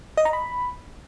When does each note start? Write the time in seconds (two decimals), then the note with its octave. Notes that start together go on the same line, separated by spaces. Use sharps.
0.17 D#5
0.25 A#5
0.33 B5